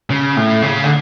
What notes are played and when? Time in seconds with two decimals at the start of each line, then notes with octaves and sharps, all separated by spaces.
0.10 C#3
0.37 A2
0.62 C#3
0.84 D3